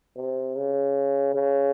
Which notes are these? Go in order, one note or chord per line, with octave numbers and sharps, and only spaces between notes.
C3
C#3
C#3